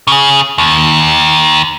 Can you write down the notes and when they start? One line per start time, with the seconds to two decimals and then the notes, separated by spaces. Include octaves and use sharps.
0.07 C#3 G#4
0.58 D#2